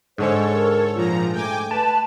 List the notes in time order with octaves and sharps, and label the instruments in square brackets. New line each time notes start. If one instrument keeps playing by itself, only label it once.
[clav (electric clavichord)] G#2 D3 G#3 [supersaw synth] A4 C#5 [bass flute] C5
[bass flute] A#4
[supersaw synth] A#2 F3 A#5 [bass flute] F4
[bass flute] A3 [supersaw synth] G5 G#5 D6
[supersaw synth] B4 [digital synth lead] A5